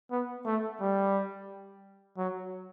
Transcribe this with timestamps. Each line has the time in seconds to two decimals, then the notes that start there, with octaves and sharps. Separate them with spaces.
0.11 B3
0.45 A3
0.80 G3
2.17 F#3